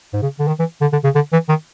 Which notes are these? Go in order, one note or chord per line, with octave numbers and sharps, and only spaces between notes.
G#2
C#3
D3
D#3
E3
D3
D3
C#3
D3
E3
D#3